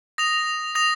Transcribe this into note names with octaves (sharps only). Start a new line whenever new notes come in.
D#6 A#6 F7
D#6 A#6 F7